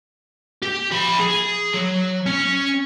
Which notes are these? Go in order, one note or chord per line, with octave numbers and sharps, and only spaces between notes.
G4
F3 B5
G#4
F#3
C#4